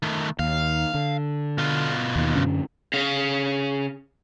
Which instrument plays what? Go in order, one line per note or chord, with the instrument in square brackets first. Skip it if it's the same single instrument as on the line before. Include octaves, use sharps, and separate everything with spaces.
[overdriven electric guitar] D#3 A3
[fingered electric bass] D#2 [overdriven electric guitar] F5
[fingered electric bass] D3
[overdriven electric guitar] B2 F4
[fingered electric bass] D#2
F#2 D3 C#4
[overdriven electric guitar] C#3 F5